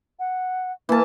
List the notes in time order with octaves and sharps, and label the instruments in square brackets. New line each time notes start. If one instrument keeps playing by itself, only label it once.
[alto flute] F#5
[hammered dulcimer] E3 A5 [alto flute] A#3